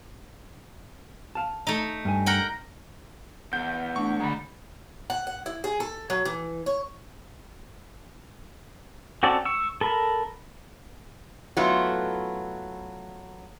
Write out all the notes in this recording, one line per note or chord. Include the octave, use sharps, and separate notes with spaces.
F5 A5
A3 D#4
G2 G#5
A#4 F#5 G5
E2 F#5 G6
A3 D4 C#6
D3 G#3 A#5 B5
F#5
F#5
E4
G#4
A4
F#3
E3
C#5
C4 C#4 F#4 A4 D5
C#6 E6
A4 A#4 B5
F#3 A3 B3 E4 F4